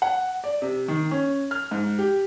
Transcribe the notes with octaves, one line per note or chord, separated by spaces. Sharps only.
F#5
D5
C3
D#3
C#4
F6
G#2
G4